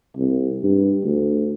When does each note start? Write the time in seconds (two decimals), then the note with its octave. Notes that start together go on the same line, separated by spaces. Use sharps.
0.17 C2
0.63 G2
1.04 D2